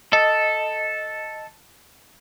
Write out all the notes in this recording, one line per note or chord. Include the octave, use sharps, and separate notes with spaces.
A4 D#5